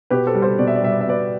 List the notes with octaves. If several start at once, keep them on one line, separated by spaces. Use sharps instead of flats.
B2 G4 B4
A4 C5
G3
A4 C5
B2 D5
E5
D5
G3 E5
D5
E5
B2 B4 D5